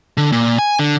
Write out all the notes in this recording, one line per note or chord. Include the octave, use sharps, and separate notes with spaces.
D3
A#2
G#5
D3